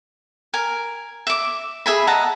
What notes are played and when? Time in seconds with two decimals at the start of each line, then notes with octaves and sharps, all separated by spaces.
0.54 A#4 G#5
1.27 E5 D6
1.86 G#4 E5 G#5 B5
2.07 D#5 F#5 A5 A#5